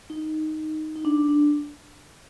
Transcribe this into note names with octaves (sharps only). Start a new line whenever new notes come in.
D#4
D#4
D4
D4